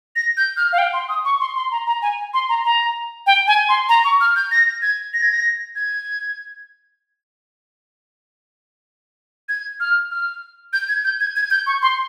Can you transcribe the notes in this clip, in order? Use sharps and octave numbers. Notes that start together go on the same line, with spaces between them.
A#6
G6
F6
F5
G5
C6
D#6
C#6
C6
C6
A#5
A#5
G#5
C6
A#5
A#5
G5
G#5
C6
A#5
C#6
F6
G6
A#6
G#6
A#6
G#6
A#6
G#6
G#6
F6
F6
G6
G#6
G6
G#6
G#6
G6
C#6
C6